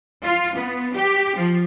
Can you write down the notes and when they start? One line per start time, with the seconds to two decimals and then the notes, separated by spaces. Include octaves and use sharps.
0.24 F4
0.56 B3
0.95 G4
1.37 F3